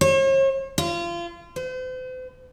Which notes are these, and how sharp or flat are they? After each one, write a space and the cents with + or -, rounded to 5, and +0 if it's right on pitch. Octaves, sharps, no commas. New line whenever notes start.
C#5 -45
F4 -30
C5 -40